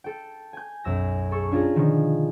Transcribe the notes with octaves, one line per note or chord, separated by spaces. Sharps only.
A4 G5
G#5 G6
B1 F#2 E6 A#6
G#4 A4 C#6 E6
C#4 D4 F4 G#4 A#4
B2 D3 D#3 F3